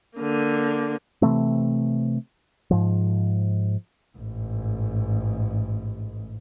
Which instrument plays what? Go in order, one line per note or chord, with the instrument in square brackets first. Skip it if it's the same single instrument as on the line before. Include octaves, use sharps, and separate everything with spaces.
[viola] D3 A#3
[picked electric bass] C3 E3 A3 C4
G#2 F3
[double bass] A1 G#2